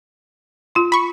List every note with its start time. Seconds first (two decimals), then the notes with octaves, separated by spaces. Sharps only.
0.75 F4 C6
0.92 B5 C#6